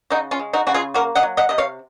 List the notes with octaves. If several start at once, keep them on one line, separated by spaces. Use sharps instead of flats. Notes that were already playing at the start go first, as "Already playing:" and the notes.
C#3 D#4 F#4
C#4 F4
G#3
D#4 F#4
C#3 F#4
F4 G#4
A#3 F#4 A#4
D#5 F#5
F#3
D#5 F#5
C3 D#5
C#5 F5